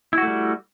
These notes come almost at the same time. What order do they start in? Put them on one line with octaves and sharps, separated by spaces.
E4 F#4 A3 G3